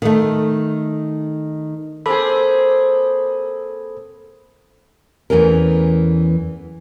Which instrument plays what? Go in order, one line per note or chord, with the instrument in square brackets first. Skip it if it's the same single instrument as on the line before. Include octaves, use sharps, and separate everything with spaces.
[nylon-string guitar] D#3 A3
[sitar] A#3 C4 G#4 [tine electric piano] A4 B5
[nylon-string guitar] E2 E3 A3 C#4 A#4